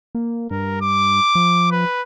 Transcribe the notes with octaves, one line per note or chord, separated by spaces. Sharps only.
A#3
G2 A#4
D6
F3
B4